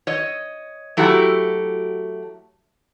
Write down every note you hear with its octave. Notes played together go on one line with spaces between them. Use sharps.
C#5 D#5
F#3 A3 E4 F#4 G4